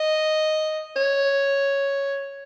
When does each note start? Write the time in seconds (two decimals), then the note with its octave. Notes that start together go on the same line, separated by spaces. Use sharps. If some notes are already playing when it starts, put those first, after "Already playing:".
Already playing: D#5
0.96 C#5